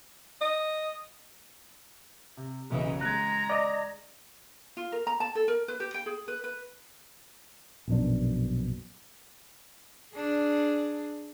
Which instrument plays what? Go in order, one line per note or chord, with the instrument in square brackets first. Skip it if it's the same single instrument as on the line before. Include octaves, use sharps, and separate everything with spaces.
[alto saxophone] D#5
[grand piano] C3
[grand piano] B1 F#2 D#5 [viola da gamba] C#3 E3
[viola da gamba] G#3 [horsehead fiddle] A#5 [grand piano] F#6 G#6
[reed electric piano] D5 D#5 [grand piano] A#6
[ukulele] F4
A#4
A#5
A5
A4
A#4
B4
G4
G5
G#4
B4
B4
[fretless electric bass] A#1 F#2 B2 D4
[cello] D4 G#4